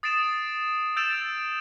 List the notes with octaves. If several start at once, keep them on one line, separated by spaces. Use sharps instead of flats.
D#6 A6 C7 D7 E7
E6 G6 A6 D7 E7 F7